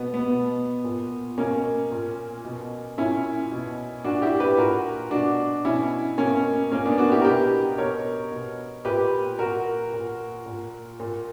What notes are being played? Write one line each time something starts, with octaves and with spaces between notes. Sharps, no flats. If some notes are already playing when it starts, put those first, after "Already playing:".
Already playing: B2 B3
B3
B2
A#2
B2 A#3 C#4
A#2
B2
A#2 C#4 E4
B2
A#2 D4 F#4
E4 G4
G4 B4
A#2 F#4 A#4
B2 D4 F#4
B2 C#4 E4
B2 A#3 C#4
A#2 A#3 C#4
B3 D4
D4 F#4
E4 G4
A#4
B2 G4 B4
B2 A#4 C#5
B2
A#2 G4 B4
A#2 F#4 A#4
A#2
A#2
A#2